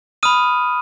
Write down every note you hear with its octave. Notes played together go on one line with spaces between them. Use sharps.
B5 D#6 F6 D#7